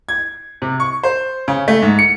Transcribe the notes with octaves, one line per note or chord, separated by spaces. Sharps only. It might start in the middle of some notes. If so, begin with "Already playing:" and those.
G#6
C3
C#6
C5
C#3
A3
G#2
C#7